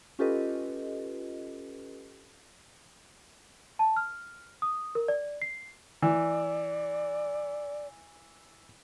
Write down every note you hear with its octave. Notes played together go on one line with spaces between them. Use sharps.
C#4 F4 G4 A4 B4 D#5
A5
F6
D#6
A#4
D5
C7
E3 D5